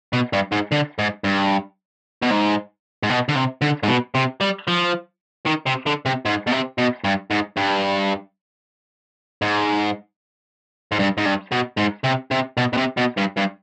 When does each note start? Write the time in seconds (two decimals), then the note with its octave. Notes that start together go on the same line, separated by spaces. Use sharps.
0.13 B2
0.33 G2
0.52 G#2
0.72 D3
0.99 G#2
1.24 G2
2.23 B2
2.31 G#2
3.03 G#2
3.09 B2
3.29 D3
3.35 C3
3.62 D3
3.83 G#2
3.88 B2
4.15 C3
4.41 G3
4.68 F3
5.46 D#3
5.66 C3
5.86 D3
6.05 C3
6.25 G#2
6.47 B2
6.52 C3
6.78 B2
7.04 G2
7.31 G#2
7.57 G2
9.42 G#2
10.92 G#2
10.99 G2
11.17 G#2
11.25 G2
11.52 B2
11.78 G#2
12.04 C3
12.31 C3
12.57 B2
12.73 B2
12.77 C3
12.97 B2
13.17 G2
13.37 G2